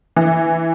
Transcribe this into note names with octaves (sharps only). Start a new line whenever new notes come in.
E3